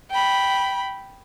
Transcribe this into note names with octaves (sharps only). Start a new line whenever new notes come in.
G5 B5